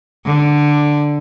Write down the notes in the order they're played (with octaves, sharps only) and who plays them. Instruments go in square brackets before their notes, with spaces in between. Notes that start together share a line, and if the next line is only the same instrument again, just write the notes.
[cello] D3